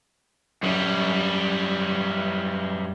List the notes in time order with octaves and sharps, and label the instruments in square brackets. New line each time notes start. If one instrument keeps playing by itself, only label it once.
[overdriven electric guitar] F#2 G3